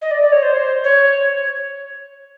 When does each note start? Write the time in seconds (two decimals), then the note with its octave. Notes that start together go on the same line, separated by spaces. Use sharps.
0.01 D#5
0.11 D5
0.22 D5
0.32 C#5
0.42 C5
0.84 C#5